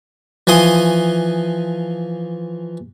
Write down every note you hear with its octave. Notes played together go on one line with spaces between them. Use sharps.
E3 F3 G#5 C6 D#6